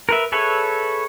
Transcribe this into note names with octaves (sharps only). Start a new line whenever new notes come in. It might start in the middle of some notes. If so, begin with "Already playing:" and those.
A#4 B4 E5
G#4 A4 B4 C#5 E5